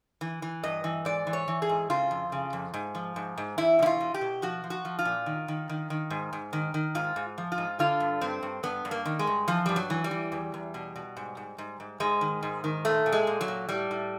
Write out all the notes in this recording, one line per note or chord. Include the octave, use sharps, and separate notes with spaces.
E3
E3
G2 D#5
E3
G#2 D5
E3
C#5
E3
G#4
G#2
C#3 F4
F2
C#3
F2
G#2
F3
G#2
G#2
E2 E4
B2 E4
F4
B2
G4
B2
F3 F#4
F3
F#4
F3
F4
A#2
D#3
D#3
D#3
D#3
G#2
G#2
D#3
D#3
G#2 F4
G#2
F3
F4
G#2
D3 F4
G2
G2 C4
G2
G2 B3
G2
A#3
D#3
G#3
G2
E3 F3
G2 G3
F#3
E3
G3
E3
E2
E2
B2
B2
G#2
G#2
G#2
G#2
G#2 G#3
D#3
G#2
D#3
A#2 A3
A#2
G#3
A#2
F#3
A#2
A2 G3
A2